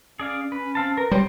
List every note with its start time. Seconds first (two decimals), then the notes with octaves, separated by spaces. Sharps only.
0.20 C#4 G#4 D5 F5
0.52 C#4 B4
0.75 C4 F5 A5
0.97 A#4 B4
1.11 G3 C5 C#5